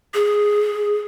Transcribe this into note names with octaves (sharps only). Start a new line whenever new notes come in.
G#4